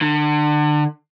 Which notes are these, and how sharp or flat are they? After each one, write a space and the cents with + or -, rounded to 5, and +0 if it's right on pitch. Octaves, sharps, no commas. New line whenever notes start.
D3 +30